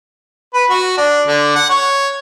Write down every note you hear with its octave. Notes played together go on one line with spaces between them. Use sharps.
B4
F#4
D4
D3
F#5
C#5